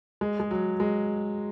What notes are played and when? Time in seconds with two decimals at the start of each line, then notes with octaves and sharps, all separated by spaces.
0.21 G#3
0.40 G#3
0.51 F#3
0.80 G#3